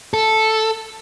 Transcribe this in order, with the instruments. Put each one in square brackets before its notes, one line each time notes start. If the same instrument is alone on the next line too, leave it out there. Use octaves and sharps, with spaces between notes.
[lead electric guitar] A4